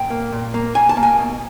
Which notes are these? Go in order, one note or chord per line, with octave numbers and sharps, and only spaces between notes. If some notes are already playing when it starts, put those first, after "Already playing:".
Already playing: A#2 G5
A#3
A#2
A#3
A#3 G#5
A5
A#3
G#5
B2